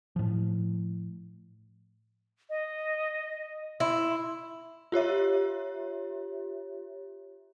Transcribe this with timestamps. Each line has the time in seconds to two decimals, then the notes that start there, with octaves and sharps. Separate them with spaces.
0.16 A2 F3
2.50 D#5
3.80 E4 C6
4.92 F4 G4 C#5 E5